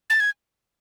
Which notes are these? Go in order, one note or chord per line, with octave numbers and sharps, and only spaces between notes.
A6
G#6